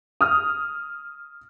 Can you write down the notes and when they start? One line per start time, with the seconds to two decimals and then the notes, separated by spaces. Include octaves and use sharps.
0.21 D#6 F6